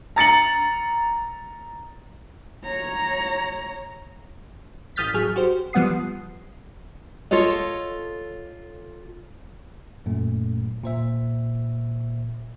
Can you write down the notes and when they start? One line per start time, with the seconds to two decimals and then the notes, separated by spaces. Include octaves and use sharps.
0.16 A#5 A6 C#7 F#7
2.64 C#5 A#5
4.96 A1 D#6 F6 G6 A6 B6
5.14 A1 F#3 G#4 F6
5.36 F#4 G4 C5
5.73 F3 G3 B3 F#5 D#6 C7
7.31 F4 A4 C#5 D#5
10.06 F#2 A#2 A3
10.84 A#2 C5 E5